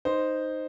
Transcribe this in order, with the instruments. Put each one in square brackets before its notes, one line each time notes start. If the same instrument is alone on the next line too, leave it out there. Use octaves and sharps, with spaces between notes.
[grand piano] D#4 C5